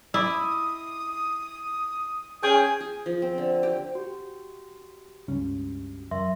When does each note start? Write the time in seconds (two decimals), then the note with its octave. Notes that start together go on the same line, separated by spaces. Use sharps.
0.14 E4 D#5 D6 D#6
2.43 C#4 G#4 G5
2.81 G#4
3.06 F3
3.22 C4
3.38 D3
3.63 G4
3.95 F#4 G4
5.28 C#2 G2 C#4
6.11 F#2 F#3 A#4 E5 C6